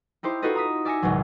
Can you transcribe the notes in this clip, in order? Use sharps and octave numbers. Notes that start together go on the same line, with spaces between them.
D#4 E4 G4 C5
D#4 F4 F#4 A4 B4 D#5
A#5 D#6 B6
D5 E5 G#5 A#6 C#7
G#1 C#2 B2 F#3